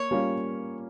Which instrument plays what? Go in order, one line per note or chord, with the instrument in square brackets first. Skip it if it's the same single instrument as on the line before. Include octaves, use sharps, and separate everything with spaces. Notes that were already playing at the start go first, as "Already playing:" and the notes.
Already playing: [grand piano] A#3 [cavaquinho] C#5
[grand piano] G3 A#3 C#4 F4